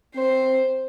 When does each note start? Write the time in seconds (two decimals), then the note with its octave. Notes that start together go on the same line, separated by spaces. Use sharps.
0.15 C4 C5